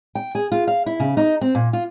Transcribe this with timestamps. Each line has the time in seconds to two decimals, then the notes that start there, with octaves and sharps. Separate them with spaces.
0.15 G5
0.35 G#4
0.52 F4
0.67 F5
0.86 E4
1.00 C#3
1.17 D#4
1.41 C4
1.55 A#2
1.73 F4